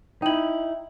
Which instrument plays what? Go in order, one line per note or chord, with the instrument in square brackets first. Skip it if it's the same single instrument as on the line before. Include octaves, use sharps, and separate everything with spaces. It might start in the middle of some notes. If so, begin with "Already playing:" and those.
[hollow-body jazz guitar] D#4 E4 [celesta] G5 F#7